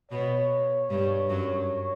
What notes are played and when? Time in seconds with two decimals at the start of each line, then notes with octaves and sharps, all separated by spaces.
0.11 B2 B3 C#5
0.90 G2 G3
1.29 F#2 F#3